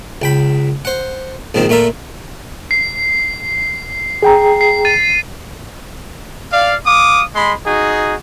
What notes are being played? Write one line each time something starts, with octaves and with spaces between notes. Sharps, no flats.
C#2 G5 B5
C5 F#5
A#1 G#2 D#3 F3 C4
A#2 A3 F4 A#4 E5
C7
G#4 G5 A#5
C7
A6 D#7
D5 F5
F5 D6 D#6
G#3 B5 C6
D#4 F#4 G#4